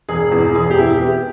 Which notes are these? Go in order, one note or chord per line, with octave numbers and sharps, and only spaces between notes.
E1 G#4
E2
E1 G#4
G4
E2 E4
G4
B3 G4